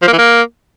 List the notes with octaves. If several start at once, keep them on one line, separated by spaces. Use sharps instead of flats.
F3
A#3
E3
A#3